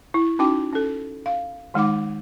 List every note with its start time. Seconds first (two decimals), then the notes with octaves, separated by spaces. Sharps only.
0.14 E4
0.39 C#4 D#4 F#4 G5 D6
0.73 C#4 A4
1.26 F5
1.74 D#3 G#3 D#4 F#5 D6